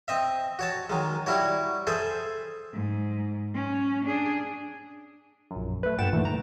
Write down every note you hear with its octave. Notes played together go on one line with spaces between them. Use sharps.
C4 D#5 E5
F#4 C#5 A5
D#3 F#3 G#3
G3 E4 F#4 C#5
G#4 A4 C5 E5
G#2
C#4
D4 G#4
A#1 F#2
A3 B4
G2 A#2 F#5 G5 A6 E7
D2 G2 A#2 D#3 E3 A3
A#5